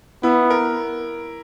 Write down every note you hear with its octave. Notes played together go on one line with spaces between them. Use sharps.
B3 E4
A#4